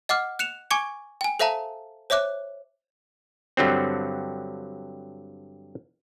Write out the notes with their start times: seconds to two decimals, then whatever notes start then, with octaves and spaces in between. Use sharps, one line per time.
0.09 D#5 F#5 D6 F6
0.39 F#6 C#7 E7 F7
0.71 G#5 C#6 D6 G#6 C#7
1.21 G5 G#5
1.39 A4 C5 E5 F5 A5 A#5
2.10 C5 C#5 E5 D6 F#6
3.57 G2 D3 F#3 C4